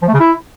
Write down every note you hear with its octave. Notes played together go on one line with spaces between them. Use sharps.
F3
A3
C#3
E4